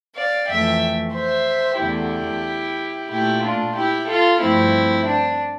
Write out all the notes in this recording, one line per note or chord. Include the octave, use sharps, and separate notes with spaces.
D5 F5
F2 E3 A3 E5 G5
C5 E5
E2 D3 A3 E4 G4
A#2 A3 E4 G4
D4 F4
E4 G4
F4 A4
G2 F3 A3 C4 E4
D4